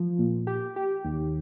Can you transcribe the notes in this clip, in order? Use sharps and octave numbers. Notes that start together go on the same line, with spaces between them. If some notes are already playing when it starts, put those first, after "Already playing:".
Already playing: F3
A#2
G4
G4
D#2